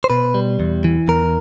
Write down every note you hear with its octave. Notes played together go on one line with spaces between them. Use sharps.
C5
B2 B4
G3
E2
E3
E2 A#4